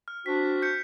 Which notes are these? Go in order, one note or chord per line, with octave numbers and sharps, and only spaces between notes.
F6
C4 D4 F#4 B6
G6 C#7